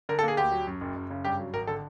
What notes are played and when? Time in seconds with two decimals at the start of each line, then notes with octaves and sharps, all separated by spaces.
0.09 D3 A#4
0.19 A4
0.23 A#3
0.28 G#4
0.37 D2 G4
0.52 F#3
0.67 F#2
0.81 F#1
0.95 F#1
1.10 C#3
1.25 G2 G4
1.39 F#3
1.53 G#1 A#4
1.67 D3 A4